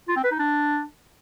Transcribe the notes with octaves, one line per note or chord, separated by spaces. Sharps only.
F4
C4
B4
D#4
D4